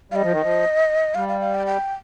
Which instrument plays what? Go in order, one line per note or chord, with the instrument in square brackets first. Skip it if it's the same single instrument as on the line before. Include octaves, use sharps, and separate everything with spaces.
[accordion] G3 [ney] D#5 F5
[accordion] F3
D#3
F3
[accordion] G3 [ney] F5
[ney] F5
F5
G5
G5